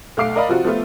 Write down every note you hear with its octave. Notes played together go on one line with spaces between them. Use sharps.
B1 A3 F5 D6 C7 D7
A#4 D5 D#5 F5 B5
C3 F3 F4 F#4
F3 A3 B3 F4